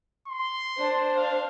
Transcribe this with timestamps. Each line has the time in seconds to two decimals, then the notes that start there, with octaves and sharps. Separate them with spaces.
0.28 C6
0.78 D4 C5
1.17 F5